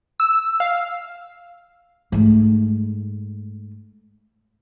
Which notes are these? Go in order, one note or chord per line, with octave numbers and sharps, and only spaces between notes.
E6
F5
G#2 A3